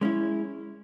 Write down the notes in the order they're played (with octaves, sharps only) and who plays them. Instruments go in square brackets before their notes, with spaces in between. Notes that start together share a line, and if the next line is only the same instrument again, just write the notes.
[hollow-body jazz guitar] G#3 C#4 E4